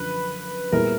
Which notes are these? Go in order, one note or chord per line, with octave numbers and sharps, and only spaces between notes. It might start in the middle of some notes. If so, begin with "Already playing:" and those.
Already playing: F#2 D3 F3 B4
A#2 G3 B3 E4 G#4 A#4